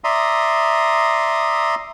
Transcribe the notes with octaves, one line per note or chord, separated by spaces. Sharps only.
D5 E5 A#5 C6 D#6